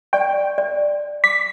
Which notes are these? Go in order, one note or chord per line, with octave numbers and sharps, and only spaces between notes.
D5 G5 C#6
D5
D6 B6